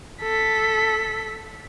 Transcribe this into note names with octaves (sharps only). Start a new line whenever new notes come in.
A4 B6